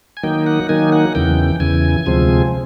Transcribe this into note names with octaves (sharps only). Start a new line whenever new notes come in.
G#5
D#3 F#3 A#3 D#4 G5
F#5
D#3 F#3 A#3 D#4 G#5
F#5
E2 C#3 E3 G5
E2 C#3 E3 G#5
D2 C3 F3 G#3 C4